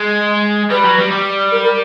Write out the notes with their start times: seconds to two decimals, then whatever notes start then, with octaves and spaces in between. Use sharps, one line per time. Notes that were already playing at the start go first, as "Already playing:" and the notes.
Already playing: G#3
0.70 G3 B4
0.84 F#3
0.98 G3
1.11 G3
1.52 A#4
1.63 A#4